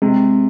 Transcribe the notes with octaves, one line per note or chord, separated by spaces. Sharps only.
C3 G#3